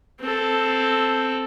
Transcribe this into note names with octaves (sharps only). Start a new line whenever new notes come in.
C4 A4